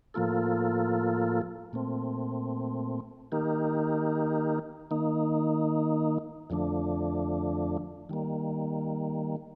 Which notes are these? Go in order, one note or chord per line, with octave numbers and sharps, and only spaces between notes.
A2 F3 A#3 F4 A4
A#2 A3 C4
D#3 A#3 D#4 G4 A#4
D#3 A#3 D#4
F2 D3 F3 A3 D4
D#3 G3 A#3